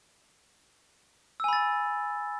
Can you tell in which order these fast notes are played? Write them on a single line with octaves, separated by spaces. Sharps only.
E6 G#5 B5 A6